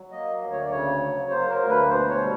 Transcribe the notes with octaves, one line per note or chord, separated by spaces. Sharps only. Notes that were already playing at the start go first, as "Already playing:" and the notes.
Already playing: F#3
A#3 D#5
D2
C#5
D5
C#3 C#5
F#3
A#3 C5
A#4
D2
B4
B2 C5
C#5
G3